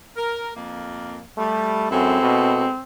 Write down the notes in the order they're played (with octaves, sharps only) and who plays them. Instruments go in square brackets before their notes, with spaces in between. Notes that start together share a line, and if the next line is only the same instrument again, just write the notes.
[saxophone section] A#4
F2 A#3
[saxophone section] G3 [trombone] A3
[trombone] F#2 [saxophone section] G#3 E4 A4 [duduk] C4
[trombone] B2